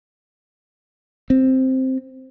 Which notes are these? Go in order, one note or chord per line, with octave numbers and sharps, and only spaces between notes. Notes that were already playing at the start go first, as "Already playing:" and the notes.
C4